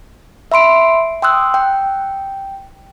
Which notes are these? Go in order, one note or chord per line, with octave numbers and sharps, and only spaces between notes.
E5 B5 C6 D7
G5 C6 D#6 E6 F#6
G5